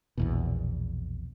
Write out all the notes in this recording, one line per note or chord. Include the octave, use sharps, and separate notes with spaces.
A#1 E2 B2